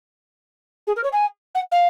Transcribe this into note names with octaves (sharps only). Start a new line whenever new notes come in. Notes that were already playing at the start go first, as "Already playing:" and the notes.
G#4
A#4
C#5
G#5
F#5
F5